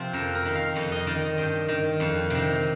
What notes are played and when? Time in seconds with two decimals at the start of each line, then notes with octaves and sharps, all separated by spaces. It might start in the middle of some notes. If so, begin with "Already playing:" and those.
Already playing: C3 F3 C4
0.13 F2 A#4
0.35 A#4
0.45 D#3
0.56 F5
0.75 F2 D#5
0.92 D#5
1.07 D#3 D5
1.22 D#5
1.37 G2 G5
1.68 D#3
2.00 F2
2.30 C3 D#3